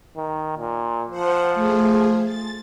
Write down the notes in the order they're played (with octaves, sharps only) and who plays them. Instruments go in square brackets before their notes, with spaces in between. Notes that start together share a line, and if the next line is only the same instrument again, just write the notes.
[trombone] D#3
A#2
[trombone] F3 [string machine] C5 F#5
[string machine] A3 G#4
A6